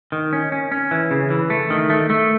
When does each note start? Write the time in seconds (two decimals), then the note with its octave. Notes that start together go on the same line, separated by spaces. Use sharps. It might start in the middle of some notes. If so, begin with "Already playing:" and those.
0.12 D#3
0.33 C#4
0.52 C#4
0.72 C#4
0.91 E3
1.11 C#3
1.30 E3
1.50 A3
1.70 D#3
1.90 A3
2.10 A3